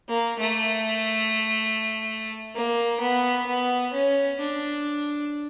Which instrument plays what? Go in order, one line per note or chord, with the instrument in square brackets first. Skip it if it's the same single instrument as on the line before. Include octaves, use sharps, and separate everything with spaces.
[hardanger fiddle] A#3
A3
A#3
B3
B3
C#4
D4